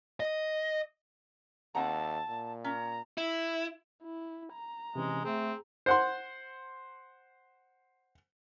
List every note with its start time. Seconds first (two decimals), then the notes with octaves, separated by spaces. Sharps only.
0.20 D#5
1.75 D#2 C4 F#5 A5 A#5
2.28 A#2
2.64 C#4 A#5
3.18 E4
4.03 E4
4.53 A#5
4.95 C3 E3 G#3 C#4
5.25 A3 C4 G#4
5.86 C5 F#5 C6